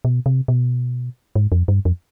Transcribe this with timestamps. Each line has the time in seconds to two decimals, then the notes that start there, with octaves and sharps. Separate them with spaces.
0.05 B2
0.26 C3
0.48 B2
1.36 G#2
1.52 F2
1.68 G2
1.85 F2